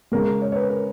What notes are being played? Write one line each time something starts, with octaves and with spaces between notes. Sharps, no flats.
C#3 G#3 A#4
A#4
C#5
C#5
B4
A#4